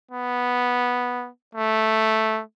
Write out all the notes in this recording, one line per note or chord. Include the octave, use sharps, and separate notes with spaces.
B3
A3